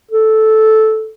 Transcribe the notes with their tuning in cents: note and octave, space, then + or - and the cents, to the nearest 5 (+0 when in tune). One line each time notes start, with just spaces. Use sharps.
A4 -10